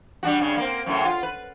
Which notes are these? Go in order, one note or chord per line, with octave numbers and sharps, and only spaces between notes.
G3 D4 F#4
G2 C#3
A#3 C4
F#2 A2 C#3
F4
B4